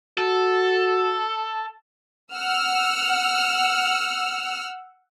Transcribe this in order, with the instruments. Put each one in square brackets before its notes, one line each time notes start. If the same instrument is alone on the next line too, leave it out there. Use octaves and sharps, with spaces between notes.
[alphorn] F#4 [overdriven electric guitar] A4
[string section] F#5 E6 F6